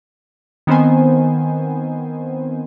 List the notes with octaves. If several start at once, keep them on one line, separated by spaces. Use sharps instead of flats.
D#3 B3 C4 C5 G#5